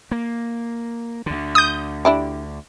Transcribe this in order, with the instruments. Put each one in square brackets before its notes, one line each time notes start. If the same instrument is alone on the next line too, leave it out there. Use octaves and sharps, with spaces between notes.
[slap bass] A#3
D2 D3
[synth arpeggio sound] D#6 G6
[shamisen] D4 E4 G4